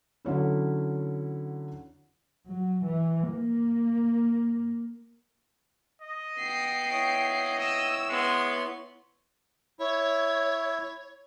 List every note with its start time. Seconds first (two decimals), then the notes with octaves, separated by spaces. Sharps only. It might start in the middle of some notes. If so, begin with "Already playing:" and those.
0.25 D3 F#3 C#4 E4
2.47 F#3
2.85 E3
3.30 A#3
6.01 D#5
6.39 B3 G5 C7
6.91 E4 C#5 D#5
7.60 D#5 E6
8.09 G#3 B3 C6
9.79 E4 C#5